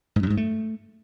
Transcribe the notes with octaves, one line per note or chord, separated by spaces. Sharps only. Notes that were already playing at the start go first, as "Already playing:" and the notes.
G#2
F#2
G#2
A3